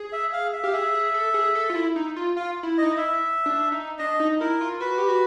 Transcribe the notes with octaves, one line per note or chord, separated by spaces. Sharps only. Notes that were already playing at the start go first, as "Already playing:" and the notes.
Already playing: G#4
E5
F5
E5
G4 F5
G#4 E5
G#4
A4
G#4
A4
F4
E4
D#4
F4
F4 F5
E4
D#4 D#5
E4
E5
D4
D#4
D4 D#5
D#4
E4 A#4
F4
F#4 B4
G4
F#4